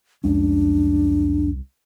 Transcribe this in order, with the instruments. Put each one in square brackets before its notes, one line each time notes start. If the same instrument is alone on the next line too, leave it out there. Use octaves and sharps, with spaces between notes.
[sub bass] C2 [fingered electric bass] F2 G#3 C#4 [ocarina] D4